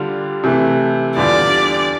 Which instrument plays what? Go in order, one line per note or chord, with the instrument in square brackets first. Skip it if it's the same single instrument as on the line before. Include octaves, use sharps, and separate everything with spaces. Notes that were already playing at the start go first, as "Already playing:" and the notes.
Already playing: [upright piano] D3 G3 D4 F4
C3 E3 A3
[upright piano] E2 D3 G3 D4 F4 [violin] D5